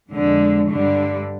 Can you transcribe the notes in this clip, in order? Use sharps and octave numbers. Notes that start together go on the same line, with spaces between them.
F2 D3 G#3
G2 D3 G3